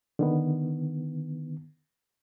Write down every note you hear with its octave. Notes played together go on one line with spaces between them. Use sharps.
D3 D#3 B3